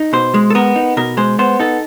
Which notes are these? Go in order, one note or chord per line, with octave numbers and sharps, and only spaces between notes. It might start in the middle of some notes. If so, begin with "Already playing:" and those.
Already playing: D#4
B2 C5
G#3
A4
B3 A#4
D#4
B2 A#4
G#3 C5
B3 C5
D#4 A4